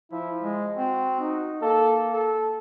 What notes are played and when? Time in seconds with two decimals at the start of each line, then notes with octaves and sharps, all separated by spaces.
0.12 F3 E4
0.42 G#3
0.76 C4 F#4
1.20 D#4
1.62 A#3 A4
2.14 A4